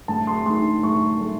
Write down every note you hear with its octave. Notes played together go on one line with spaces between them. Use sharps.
A2 A5
C6
A3 D#4 C6
A2 C#6
A3